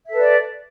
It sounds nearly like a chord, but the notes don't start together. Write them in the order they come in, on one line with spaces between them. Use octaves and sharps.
E5 A4 B4 D5